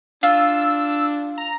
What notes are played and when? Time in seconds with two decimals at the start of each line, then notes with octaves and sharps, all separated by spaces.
0.23 D4 F4 E6
1.38 A#5